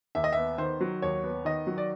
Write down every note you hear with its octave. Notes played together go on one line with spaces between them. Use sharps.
D#2 E5
D#5
B3 E5
D#3 C5
F#3
D#2 C#5
B3
D#3 D#5
F#3
D5